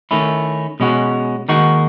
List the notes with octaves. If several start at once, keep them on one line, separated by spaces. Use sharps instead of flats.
D#3 A3 C#4 E4
B2 G#3 C#4 F#4
D#2 D#3 G#3 D#4 F#4